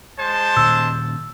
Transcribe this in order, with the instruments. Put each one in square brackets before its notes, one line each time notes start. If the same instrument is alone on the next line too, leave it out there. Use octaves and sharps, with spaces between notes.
[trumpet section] G#3 C5 A5
[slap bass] A#2 D#3 C#4 [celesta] E6